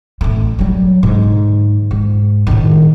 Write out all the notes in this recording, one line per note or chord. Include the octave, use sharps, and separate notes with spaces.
A1 A3
F#3 G3
G#2 D3
G#2
A2 D#3